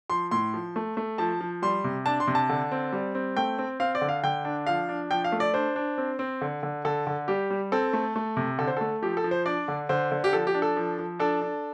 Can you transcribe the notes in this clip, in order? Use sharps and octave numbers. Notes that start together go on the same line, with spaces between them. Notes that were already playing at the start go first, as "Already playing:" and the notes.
F3 C6
A2 C6
F3
A3
A3
F3 A5
F3
G3 C6
C3
D4 A5
C6
C3
A5
D3
C4
G3
C4
A3 G5
C4
C4 F5
D5
D3
F5
D3 G5
D4
F3 F5
D4
F3 G5
F5
A3
D5
D4 C5
D4
C4
C4
D3
D3
D3 A4
D3
G3 G4
G3
C4 A4
A3
A3
C3
D3 A4
C5
A3 A4
F3 G4
A4
F3
C5
D4 D5
D3
D3 C5
D3
G4
F3 A4
G4
D4
A4
F3
F3
D4 A4
D4